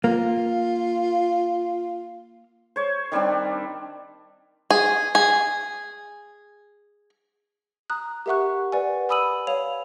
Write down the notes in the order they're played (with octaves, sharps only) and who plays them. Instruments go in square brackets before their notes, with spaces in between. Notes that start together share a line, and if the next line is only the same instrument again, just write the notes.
[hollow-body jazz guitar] A#3 [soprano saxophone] F4
[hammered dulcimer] C5 C#5
D#3 G3 C4 D4
[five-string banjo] G#4
G#4
[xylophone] A#5 D#6 F#6
G4 A#4 E5 F#5 C#6 F#6
B4 D5 F#5 G#5
G#5 B5 D#6 E6 D#7 F#7
C#5 F5 F7